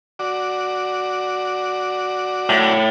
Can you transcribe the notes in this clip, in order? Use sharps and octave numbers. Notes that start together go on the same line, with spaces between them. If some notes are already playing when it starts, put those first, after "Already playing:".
F#4 D5
A2